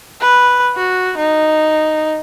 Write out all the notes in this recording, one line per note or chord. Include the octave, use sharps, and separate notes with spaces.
B4
F#4
D#4